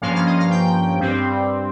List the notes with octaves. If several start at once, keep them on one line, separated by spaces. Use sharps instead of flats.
G2 F3 A#3 C#4 F5
F5
D#5
F5
G5
G2 G3 C4